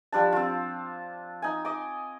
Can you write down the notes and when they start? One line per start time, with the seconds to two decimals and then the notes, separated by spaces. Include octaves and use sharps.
0.12 F3 G3 D4 A5
0.32 C4 F4
1.42 D#4 G#5
1.65 D#5 D6